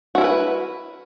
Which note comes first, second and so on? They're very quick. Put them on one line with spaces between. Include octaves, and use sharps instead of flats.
F#4 E4 A#4 B4